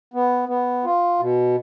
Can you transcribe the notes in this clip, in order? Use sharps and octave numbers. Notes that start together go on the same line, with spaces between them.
B3
B3
F4
B2